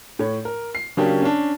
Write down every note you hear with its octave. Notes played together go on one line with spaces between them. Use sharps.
A2 C#5
A#4
C7
C#3 F#3 A#3 C#4 D4 G4
C#4 D4